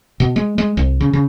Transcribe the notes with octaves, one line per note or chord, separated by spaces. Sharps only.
B2
G#3
G#3
C2
C#3
C#3